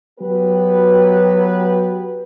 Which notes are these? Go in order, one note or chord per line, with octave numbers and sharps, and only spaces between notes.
F#3 B3 G4 B4